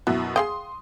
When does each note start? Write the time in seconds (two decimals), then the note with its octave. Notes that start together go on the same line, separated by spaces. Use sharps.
0.07 F#2 B2 E4 F#4
0.36 G#4 F5 G5 C6 D#6